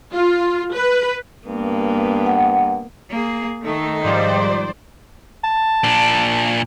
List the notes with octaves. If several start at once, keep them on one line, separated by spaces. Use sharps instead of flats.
F4
B4
G2 A#3 B3
F#5
A#3 G#4
D#3 A3 D#4
G#2 F3 G3 C5 D5
A5
A#2 D4